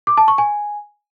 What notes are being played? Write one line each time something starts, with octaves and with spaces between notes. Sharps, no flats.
D6
A5
C#6
G#5